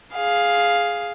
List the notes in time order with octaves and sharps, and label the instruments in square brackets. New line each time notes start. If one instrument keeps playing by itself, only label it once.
[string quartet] G#4 F5